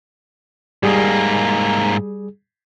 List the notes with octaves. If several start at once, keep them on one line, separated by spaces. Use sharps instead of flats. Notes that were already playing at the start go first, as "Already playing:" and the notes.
G#2 G3 A#3 G#4